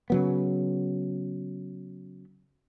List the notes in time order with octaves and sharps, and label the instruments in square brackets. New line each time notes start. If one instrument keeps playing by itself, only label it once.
[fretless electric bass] C#3 F#3 B3